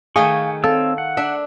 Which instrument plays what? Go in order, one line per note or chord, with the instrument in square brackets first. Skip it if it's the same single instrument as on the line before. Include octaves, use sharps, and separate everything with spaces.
[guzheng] D#3 A3 D#5 [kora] G#4 [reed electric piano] F5 G#5 [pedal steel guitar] C#6
[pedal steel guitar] C4 C#5 E6 [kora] A4 [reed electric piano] F5
[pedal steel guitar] F#5
[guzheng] D4 [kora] E5